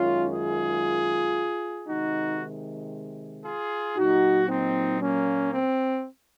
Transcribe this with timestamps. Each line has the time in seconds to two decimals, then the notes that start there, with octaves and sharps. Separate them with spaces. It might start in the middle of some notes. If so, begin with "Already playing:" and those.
Already playing: F#2 D#3 G#3 C#4 F4
0.31 F4 G#4
1.87 C3 D#3 G#3 D#4 F#4
3.44 F4 G#4
3.97 A#2 F#3 D#4 F#4
4.49 C4 D#4
5.01 A#3 C#4
5.54 C4